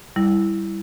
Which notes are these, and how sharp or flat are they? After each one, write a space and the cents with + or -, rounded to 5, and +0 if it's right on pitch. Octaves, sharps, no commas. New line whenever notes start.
G3 +0 E4 +0